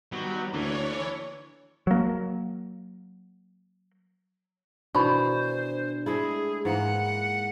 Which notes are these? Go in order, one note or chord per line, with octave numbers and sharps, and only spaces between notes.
D#3 F#3 G3 B3
D2 D3 E3 A#3 D4 C#5
F#3 A#3
B2 D#3 E3 D4 C5 B5 C#6
G#3 A3 E4 G#4
G#2 E3 A#3 F#5